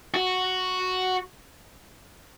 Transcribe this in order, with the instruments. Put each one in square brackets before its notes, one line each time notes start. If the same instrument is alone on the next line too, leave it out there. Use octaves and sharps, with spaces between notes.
[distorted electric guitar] F#4